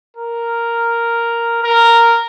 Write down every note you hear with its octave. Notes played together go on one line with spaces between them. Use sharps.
A#4
A#4